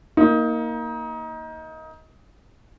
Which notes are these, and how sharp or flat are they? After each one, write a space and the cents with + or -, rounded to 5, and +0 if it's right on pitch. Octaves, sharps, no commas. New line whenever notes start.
A#3 +0 D#4 +25